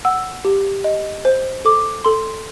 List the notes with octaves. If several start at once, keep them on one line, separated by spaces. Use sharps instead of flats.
F#5 E6
G4
D#5
C5
A4 D6
A4 C6